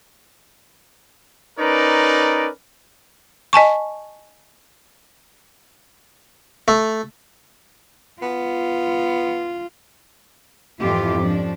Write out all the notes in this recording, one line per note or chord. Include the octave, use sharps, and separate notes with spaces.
C#4 D#4 A#4 B4 D5
D#5 G#5 A5 C#6
A3
B3 F4
F2 G#2 E3 E4 F4 G4
F3 C#4 D4